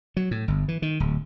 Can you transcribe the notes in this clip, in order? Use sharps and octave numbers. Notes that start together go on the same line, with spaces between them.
F#3
A2
G1
E3
D#3
D1